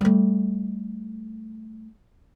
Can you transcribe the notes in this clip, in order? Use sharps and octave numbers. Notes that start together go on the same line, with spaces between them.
G3 A3